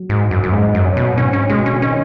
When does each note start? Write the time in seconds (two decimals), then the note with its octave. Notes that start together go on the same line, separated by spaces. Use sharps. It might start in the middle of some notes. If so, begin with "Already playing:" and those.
Already playing: F#3
0.09 G#2
0.31 F#2
0.43 F#2
0.52 G#2 G#3
0.75 F#2
0.85 F#3
0.97 B2
1.17 G#2 C#4
1.33 C#4
1.49 B2 G#3
1.66 C#4
1.73 C#3
1.82 D#3 C#4